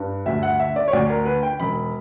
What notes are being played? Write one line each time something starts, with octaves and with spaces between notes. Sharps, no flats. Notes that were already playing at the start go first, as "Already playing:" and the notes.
Already playing: G2
D2 E5
F#5
D3 E5
D5
C#5
D2 D5
A#4
D3 B4
G5
E1 B5